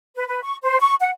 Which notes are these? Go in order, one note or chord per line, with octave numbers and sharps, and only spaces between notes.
B4
B4
C#6
C5
C#6
F#5